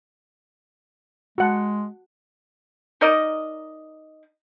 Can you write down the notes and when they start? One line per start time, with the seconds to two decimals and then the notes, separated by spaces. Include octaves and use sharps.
1.38 G#3 F#4 F#5 A5
3.01 D#4 A#4 D5 D#5